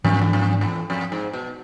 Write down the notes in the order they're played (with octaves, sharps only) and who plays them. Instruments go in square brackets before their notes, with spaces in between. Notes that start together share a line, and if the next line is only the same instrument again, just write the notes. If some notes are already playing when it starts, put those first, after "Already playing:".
[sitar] F2 [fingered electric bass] G#2 E3 B3 D4
[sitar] E2
F2
E2
F2
G#2
B2